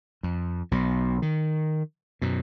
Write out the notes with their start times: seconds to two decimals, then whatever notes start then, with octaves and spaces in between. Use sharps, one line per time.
0.23 F2
0.71 B1 B2
1.22 D#3
2.22 F#2 B2